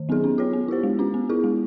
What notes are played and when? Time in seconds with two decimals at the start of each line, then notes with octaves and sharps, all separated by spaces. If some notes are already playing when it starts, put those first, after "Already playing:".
Already playing: D#3
0.09 F#3 B3 D#4 G#4
0.24 C#4
0.38 F4 G#4 C#5
0.53 B3
0.68 E4 G4 C5
0.83 G#3
0.99 C#4 F4
1.14 B3
1.29 E4 G#4
1.44 G#3